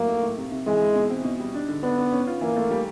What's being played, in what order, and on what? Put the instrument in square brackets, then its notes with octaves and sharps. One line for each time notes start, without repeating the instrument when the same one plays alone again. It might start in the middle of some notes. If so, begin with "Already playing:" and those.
Already playing: [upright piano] A2 F#3 [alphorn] A#3
[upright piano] A3
A2
C3
C3
[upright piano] E3 [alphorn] G#3
[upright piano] E3
B2
C4
B2
G3
D4
D3
[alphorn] B3 [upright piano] D4
[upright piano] D4
C#4
F4
[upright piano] E3 [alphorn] A#3
[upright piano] A3
G3